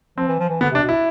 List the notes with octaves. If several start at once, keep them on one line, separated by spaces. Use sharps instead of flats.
F3 C4
E3
F3
E3
D3 B3
C3 D4
B2
E4